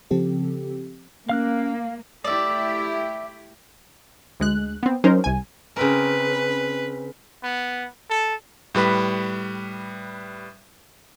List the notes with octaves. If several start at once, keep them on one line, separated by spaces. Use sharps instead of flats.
C#3 F3 C4 G4 A4
A#3 C#4 F5 F6 F#6
A3 E4 G4 D5 E5
D2 G#3 F#6
B3 C4
F#3 C#4 D#4 A#4 C5
C2 G#5
C#3 C4 A#4 B4
B3
A4
A2 G3 B4 B5